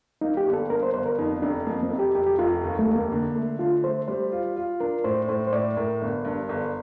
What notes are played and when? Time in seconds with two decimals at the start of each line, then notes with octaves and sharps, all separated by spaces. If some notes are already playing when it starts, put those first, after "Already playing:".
0.21 A#3 D#4
0.37 G4
0.46 G1
0.53 A4
0.70 G2 A#4
0.83 C5
0.94 G1 C5
1.06 A#4
1.18 F2 D#4
1.42 F1 D4
1.67 F2 A#3
1.83 C4
1.91 F1
1.99 G4
2.15 F1 G4
2.26 G4
2.39 F1 F4
2.63 D#2
2.79 A3
2.88 F1
2.96 A#3
3.12 D3
3.35 A3
3.59 D3 F4
3.83 A3 C5
4.08 G3 C5
4.32 F4
4.56 F4
4.80 D4 A#4
5.04 A2 C5
5.28 A2 C5
5.47 C5
5.53 A2 D5
5.77 A2 A#4
6.01 G1
6.25 G2
6.49 G1